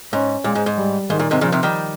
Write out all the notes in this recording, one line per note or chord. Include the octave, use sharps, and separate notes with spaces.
G#2 C#4
A#2 G#3
G#2
G#2
G3
G#2 D#3
A#2
G#2 C3
A#2 C#3 F3
C3 D#3
D#3 G3